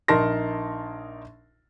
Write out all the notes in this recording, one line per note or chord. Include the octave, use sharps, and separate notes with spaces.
A#1 D#4 A#4 A5 C6 A#6